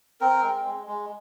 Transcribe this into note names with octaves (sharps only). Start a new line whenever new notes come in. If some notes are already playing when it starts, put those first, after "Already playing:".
C4 A#4
G#3
G#3
G#3